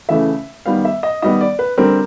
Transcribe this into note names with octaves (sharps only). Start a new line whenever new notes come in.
C#3 E3 A3 E5
D#3 G3 B3 F5
E5
D#5
D#3 G3 B3 D#5
D5
B4
D3 G3 C4 A#4